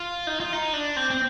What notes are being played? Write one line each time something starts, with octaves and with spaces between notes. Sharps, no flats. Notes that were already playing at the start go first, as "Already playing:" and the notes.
Already playing: F4
D#4
F4
D#4
D4
C4
C4